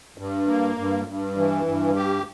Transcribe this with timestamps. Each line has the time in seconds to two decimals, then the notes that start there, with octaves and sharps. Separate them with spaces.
0.18 G2
0.47 A#3
0.78 G2
1.08 G2
1.37 E3
1.66 G2
1.96 G4